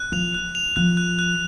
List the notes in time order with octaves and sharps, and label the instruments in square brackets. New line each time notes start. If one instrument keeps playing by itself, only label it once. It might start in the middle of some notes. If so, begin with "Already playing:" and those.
Already playing: [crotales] F#6
[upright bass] F3 [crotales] F7
[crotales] F#6
F7
[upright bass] F3 [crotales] F#6
[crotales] F#6
F#6